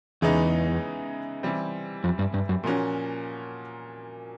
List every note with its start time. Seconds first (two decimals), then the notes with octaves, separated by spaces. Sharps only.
0.22 E2 C#3 E3 G#3 B3 D#4
1.43 E3 G3 C4
2.04 F2
2.19 G2
2.34 G2
2.49 F#2
2.64 A#2 F3 A#3 C#4 F#4